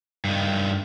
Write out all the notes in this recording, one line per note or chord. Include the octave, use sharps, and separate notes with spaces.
G2 D#3